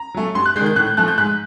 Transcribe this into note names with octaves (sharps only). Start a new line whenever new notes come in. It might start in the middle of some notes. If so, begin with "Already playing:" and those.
Already playing: A#5
F#3 A3
G2 C6
F#6
G#3 G6
D#3
G6
A2 F#6
G6
F3 A3 F#6
G6
G#2 F#6